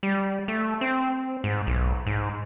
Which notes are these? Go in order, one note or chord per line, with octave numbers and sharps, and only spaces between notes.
G3
A3
C4
G#2
B1
G#2